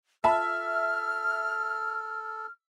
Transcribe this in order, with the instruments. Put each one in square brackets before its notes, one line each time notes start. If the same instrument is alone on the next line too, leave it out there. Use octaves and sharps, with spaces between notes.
[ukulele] F4 A5 B5 [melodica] A4 [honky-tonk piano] E5 [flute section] F6